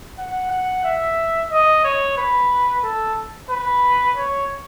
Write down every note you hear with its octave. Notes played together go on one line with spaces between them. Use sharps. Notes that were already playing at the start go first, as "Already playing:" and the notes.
F#5
F#5
E5
D#5
C#5
B4
A4
B4
C#5